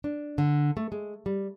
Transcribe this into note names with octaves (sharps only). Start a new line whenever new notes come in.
D4
D3
A3
G#3
G3